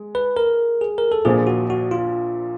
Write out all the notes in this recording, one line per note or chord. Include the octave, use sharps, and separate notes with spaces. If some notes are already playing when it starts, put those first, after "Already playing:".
Already playing: G#3
B4
A#4
G#4
A#4
A4
A#1 A#2 F3 G#4
F#4
F#4
F4